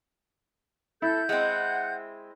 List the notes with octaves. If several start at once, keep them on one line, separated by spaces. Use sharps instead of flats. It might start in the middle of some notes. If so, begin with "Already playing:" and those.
E4 A4 G6
G#3 C4 F#5